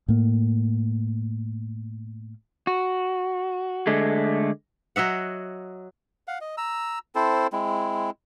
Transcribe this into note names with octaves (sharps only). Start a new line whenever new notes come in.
A2 A#3
F#4
D3 G#3 A3
F#3 D#5 E5 F#5
F5 F#5
D#5
A#5 E6
C4 E4 A4 C5
G#3 C4 E4